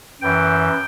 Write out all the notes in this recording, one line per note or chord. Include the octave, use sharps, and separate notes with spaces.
F#2 E3 G5